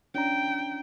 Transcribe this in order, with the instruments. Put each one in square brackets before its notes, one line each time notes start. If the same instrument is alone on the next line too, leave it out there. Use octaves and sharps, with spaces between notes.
[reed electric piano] C#4 D4 A#5 [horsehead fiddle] G5